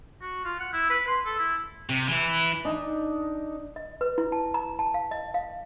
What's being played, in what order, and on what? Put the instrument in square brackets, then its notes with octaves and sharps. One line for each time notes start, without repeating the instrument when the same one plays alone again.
[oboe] F#4
F4
F#5
E4
B4
C6
A4
E4
[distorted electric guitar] C3
E3 E4
[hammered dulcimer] D4 D#4
[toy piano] D#5
B4
E4
A5
A#5
A5
F5
D#5
F5